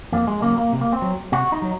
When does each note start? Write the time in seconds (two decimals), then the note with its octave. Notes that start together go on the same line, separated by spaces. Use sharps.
0.12 F2 A#3
0.27 G#3
0.42 C#3 F#3 A#3
0.58 A#3
0.72 C3
0.81 A#3
0.93 C4
1.02 F#3
1.32 C3 F#4
1.52 D#4
1.62 F#3